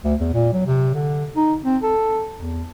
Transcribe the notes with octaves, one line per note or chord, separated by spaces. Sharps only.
D2
E2
A#2
F#3
C3
D3
D#4
C4
A4
E2